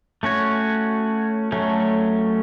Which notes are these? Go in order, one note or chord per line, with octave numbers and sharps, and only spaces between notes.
A3 C#4 F#4 C#5
F#3 A3 C#4